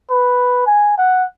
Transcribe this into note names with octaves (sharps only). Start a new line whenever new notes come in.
B4
G#5
F#5